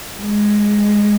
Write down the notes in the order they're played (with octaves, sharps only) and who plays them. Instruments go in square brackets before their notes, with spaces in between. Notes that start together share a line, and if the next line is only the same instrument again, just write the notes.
[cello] G#3